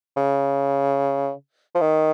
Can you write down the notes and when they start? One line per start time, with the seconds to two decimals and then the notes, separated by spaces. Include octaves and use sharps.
0.16 C#3
1.75 F3
1.81 D#3